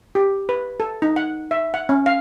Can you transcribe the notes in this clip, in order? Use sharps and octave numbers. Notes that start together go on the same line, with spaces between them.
G4
B4
A4
D#4
F#5
E5
F#5
C#4
F5